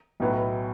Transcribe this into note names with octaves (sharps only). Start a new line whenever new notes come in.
B1 A2 F#3 B3